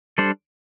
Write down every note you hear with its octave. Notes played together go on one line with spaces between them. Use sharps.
G3 D4 A4 C5